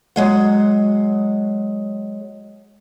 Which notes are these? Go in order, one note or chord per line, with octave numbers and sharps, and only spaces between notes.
F#3 G#3 F#5